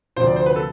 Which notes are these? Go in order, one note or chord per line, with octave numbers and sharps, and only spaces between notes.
D2 C3 F3 C5
D5
C5
B4
A4